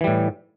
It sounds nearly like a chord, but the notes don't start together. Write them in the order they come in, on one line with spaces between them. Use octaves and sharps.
E3 G3 A2